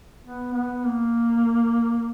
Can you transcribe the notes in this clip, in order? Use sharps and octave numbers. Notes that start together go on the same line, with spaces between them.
B3
B3
A#3